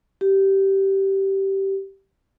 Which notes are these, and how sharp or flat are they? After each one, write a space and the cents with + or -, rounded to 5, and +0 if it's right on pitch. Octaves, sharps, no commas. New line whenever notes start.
G4 -15